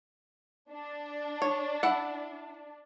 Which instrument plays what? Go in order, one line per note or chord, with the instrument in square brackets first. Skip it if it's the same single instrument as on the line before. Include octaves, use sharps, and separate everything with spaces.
[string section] D4
[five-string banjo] C#5
E4 F#5